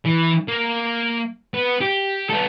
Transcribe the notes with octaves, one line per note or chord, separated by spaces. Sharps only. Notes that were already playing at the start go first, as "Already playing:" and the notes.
E3
A#3
B3
G4
B3 A4